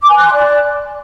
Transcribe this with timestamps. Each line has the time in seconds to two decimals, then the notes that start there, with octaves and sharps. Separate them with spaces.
0.01 D6
0.09 G#5
0.17 F#6
0.25 C6
0.33 D5